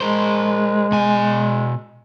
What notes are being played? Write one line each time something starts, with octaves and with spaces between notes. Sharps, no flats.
G#3 A#4 C5
B2 G#5